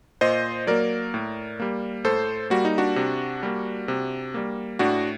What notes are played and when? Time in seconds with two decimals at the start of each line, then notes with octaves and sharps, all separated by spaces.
0.21 A#2 C5 D#5
0.67 F#3 A#3 A#4 D5
1.14 A2
1.60 G3 A#3
2.04 A2 A4 C5
2.50 G3 A#3 F#4
2.65 D#4
2.78 D4 F#4
2.96 C3
3.43 G3 A#3
3.88 C3
4.34 G3 A#3
4.79 A2 D4 F#4